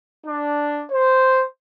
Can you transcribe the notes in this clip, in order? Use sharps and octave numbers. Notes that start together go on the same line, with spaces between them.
D4
C5